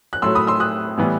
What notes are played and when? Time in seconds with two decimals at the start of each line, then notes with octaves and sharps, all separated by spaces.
0.13 F#6
0.22 A2 F#3 A3 C6 E6
0.35 B5 D#6
0.47 C6 E6
0.60 D#6 F#6
0.98 A2 E3 G3 B3